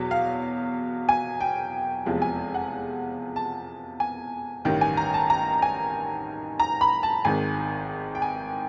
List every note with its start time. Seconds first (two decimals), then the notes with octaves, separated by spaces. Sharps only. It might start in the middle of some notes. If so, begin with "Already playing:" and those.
Already playing: E2 B2 F#3
0.11 F5
1.09 G#5
1.41 G5
2.06 F1 E2 C3 F3 G#3
2.22 G#5
2.54 F#5
3.36 A5
4.00 G#5
4.65 A1 G2 D#3 G5
4.81 G#5
4.97 A#5
5.14 A5
5.30 A#5
5.62 G#5
6.60 A#5
6.81 B5
7.03 A5
7.25 G#1 G#2 D#3 G#5
8.15 G5
8.22 G#5